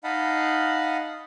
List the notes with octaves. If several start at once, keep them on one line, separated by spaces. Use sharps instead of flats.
D#4 D#5 F5 F#5 A5 B5